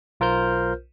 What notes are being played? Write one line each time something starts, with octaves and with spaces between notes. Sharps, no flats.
B1 F4 A#4 C5 F6 G6